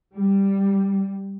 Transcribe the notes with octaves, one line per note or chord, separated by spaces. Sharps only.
G3